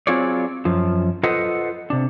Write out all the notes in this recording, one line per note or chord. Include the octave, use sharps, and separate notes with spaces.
F#3 C4 F4 G#4 C#5 D5
F#2 F3
F4 A4 B4 C5 D#5 F#5
C3 D4